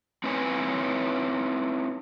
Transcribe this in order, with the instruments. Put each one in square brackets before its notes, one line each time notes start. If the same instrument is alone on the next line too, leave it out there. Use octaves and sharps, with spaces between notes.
[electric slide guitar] C4 D#4 E4 B4 C#5 G#5